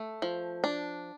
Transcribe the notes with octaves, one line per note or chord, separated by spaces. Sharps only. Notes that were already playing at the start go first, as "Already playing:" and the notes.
Already playing: A3
F3
D4